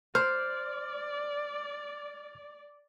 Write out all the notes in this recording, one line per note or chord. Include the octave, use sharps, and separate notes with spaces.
C5 D5 F6